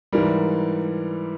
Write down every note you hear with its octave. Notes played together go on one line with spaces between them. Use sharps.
G#2 E3 G3 A#4